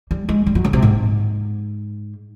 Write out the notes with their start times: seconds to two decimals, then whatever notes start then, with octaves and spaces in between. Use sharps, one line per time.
0.11 G3
0.29 G#3
0.46 G3
0.55 F#3
0.64 C#3
0.73 C3
0.82 G#2